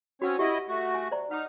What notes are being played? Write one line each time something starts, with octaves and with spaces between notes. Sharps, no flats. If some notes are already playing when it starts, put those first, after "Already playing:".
C4 C#4 F#4 C#5 F#5
E4 G4 D#5 E5 F#5
A3 F#4
G#5
C5 D5 A#5
D#4 F#5 D#6 F6